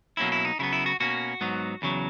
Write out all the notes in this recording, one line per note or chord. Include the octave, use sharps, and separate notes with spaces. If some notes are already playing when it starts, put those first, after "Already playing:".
B2 F#3 A#3 C#4 E4
E4
D#4
C#3 F#3 B3 E4
E4
F#4
B2 A#3 C#4 F#4
G#2 F#3 B3
E2 C#3 F#3